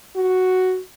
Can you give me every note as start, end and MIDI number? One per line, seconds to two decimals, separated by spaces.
0.16 0.79 66